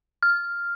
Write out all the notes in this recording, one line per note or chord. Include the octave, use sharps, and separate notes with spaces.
F6